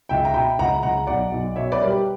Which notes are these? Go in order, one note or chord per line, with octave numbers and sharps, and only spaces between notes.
C#2 E5 G5
A#5
B2 G5 B5
C#2 F#5 A#5
C#2 F#5 A#5
B1 D5 F#5
B1
B2 C#5 E5
B4 D5
G3 A#4
G4